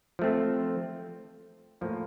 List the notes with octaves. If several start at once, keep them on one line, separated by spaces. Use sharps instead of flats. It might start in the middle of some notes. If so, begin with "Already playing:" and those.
F3 A3 C4
A2 F3 A#3